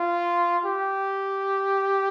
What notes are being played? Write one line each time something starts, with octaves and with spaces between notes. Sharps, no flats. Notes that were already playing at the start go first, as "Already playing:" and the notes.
Already playing: F4
G4